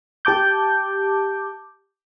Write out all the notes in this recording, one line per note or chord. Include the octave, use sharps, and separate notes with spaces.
G4 A5 D6 G6